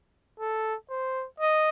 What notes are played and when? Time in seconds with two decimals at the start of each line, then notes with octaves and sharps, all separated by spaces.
0.40 A4
0.90 C5
1.40 D#5